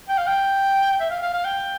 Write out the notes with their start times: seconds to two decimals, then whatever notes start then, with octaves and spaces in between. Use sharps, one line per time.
0.08 G5
0.18 F5
0.27 G5
1.00 E5
1.10 F5
1.22 F5
1.34 F5
1.45 G5